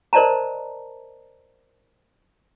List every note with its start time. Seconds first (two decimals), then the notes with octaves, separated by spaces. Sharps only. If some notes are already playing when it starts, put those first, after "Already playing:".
0.13 A#4 C5 D5 D#5 A5 A#5